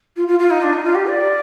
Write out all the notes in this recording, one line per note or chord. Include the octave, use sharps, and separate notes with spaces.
F4
F4
F4
D#4
D4
D#4
F4
G4
D5